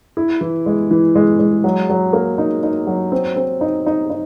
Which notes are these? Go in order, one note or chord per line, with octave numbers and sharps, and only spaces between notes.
E4
E3
G#3
E3
G#3
G#3
F#3
F#3
A#3
D#4
D#4
F#3
C4
C4
D#4
D#4
D#4